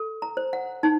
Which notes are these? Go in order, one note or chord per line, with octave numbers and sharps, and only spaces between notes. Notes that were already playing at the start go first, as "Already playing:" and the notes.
Already playing: A4
A#5
C5
F#5
D#4 A5